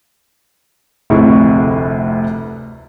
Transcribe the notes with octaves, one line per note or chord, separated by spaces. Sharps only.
F1 D2 C3 E4 G#4 C#6